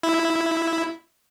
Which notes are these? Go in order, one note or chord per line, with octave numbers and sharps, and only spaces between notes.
E4